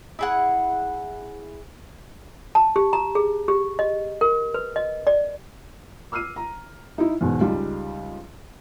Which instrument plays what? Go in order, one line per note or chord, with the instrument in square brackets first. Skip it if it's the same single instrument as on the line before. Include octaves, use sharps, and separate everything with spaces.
[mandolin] E4 G#4 F#5
[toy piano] A5
G4
A#5
G#4
G4
D#5
A#4
B4
D#5
D5
[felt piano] D6 E6 F6 C7 D#7
A#5
D#4 E4
E2 G#2 B2
C#2 G3 D#4 F4